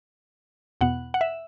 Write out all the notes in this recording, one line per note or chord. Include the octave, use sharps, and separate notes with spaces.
E2 B2 B3 F#5
F#5
E5